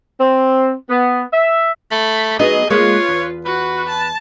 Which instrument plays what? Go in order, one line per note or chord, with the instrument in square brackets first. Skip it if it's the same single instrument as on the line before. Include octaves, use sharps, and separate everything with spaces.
[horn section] C4
B3
E5
[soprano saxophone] A3 [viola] B5
[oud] F#3 B3 D#4 [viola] G#4 [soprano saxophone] D#5
[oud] G#3 A#3 [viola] F4 B4 [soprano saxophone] C#5
[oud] E2
[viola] F#4 [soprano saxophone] B4
[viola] A5